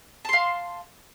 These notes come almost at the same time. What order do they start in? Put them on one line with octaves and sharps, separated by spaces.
A5 C6 F5